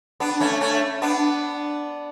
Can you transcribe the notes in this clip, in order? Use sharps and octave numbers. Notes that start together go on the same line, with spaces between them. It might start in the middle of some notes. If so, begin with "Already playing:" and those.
B3 D4
A3 C#4
A3 C#4
B3 D4